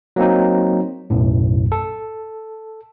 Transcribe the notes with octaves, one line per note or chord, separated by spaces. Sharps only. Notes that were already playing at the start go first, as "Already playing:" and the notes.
F#3 A#3 C4 D#4
B1 F#2 A2
A4